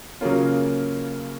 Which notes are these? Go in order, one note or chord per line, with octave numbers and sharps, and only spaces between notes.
C#3 F#3 A#3 C#4 F4